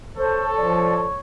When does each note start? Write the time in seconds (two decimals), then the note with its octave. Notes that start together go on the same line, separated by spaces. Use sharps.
0.17 A4 C5 C#5
0.57 F3 D5